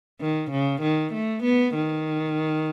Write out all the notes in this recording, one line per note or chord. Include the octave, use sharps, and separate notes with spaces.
D#3
C#3
D#3
A3
B3
D#3